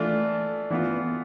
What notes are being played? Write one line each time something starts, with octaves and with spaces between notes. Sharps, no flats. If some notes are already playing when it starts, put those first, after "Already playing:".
Already playing: E3 A3 D4 F4
E3 B3 F4